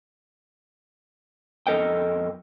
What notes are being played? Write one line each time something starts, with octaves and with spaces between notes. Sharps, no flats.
F2 A4 A#4 D#5 G5